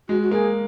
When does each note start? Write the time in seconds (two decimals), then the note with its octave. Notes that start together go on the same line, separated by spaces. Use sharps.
0.09 G#3 F#4
0.22 F#4
0.31 A#3 G#4